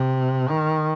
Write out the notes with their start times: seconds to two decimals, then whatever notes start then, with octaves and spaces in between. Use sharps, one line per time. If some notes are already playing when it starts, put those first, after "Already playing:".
Already playing: C3
0.49 D#3